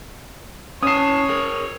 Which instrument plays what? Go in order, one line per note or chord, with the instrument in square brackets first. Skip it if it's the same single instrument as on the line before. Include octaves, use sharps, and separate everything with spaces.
[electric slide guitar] C#4 A5 [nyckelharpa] C#5 [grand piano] D#6 C7
[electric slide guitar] G#4 A#4